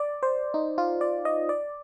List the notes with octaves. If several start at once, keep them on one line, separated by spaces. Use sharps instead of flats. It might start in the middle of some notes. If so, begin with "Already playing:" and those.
Already playing: D5
C5
D#4
F4
D5
D#5
D5